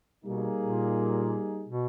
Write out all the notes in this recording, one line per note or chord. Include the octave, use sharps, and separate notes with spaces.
B2 G3 A#3 D#4 G#4
A#2
B2